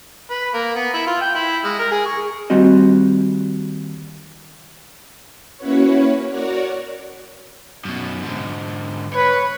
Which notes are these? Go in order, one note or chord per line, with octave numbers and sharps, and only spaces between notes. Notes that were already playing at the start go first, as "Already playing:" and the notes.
B4
A#3
B3
E4
F4
G5
E4
G#3
A#4
G#4
C#6
D#2 G3 C4 F#4 D#5
A#3 C#4 E4 F#4 B4 C#5
F#4 A#4 C#5 D5 F#5
F#2 B2
G#2 D3
B4 C#5